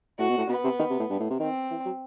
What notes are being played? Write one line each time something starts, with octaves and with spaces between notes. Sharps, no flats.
A2 F#4
B2
A2
B2 B3
C3
D#3
C3
A2
G2
A2
C3
D#3 C4
E3
F#3